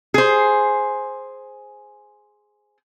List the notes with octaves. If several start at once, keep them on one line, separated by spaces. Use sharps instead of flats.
G#4 C5